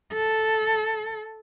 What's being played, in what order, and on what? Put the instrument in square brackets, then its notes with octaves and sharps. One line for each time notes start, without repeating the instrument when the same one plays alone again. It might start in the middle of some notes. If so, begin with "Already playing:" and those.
[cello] A4